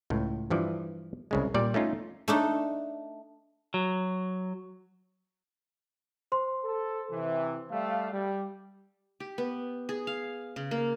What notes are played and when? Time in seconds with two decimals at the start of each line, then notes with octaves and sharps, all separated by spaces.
0.10 C#2 A2
0.50 G2 E3 F3 D5
1.31 C2 C#3 G#3
1.54 A#2 G3 D5
1.74 A3 C#4 D#4 F4
2.28 A3 D4 D#4
3.74 F#3
6.32 C5 C6
6.64 A4
7.11 C3 E3
7.71 G3 A3 F5
8.12 G3
9.20 G4
9.38 B3
9.89 G#4
10.07 F5
10.56 C#3
10.71 A#3